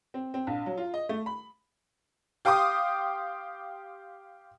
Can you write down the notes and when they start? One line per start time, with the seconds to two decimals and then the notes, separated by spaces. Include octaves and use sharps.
0.14 C4
0.34 C4
0.47 A#1
0.66 F#3
0.78 F4
0.94 D#5
1.09 A3
1.26 B5
2.45 G4 F5 G5 C6 D6 D#6